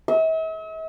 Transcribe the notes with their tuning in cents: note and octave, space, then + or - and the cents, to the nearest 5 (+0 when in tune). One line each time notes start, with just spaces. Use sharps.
E5 -45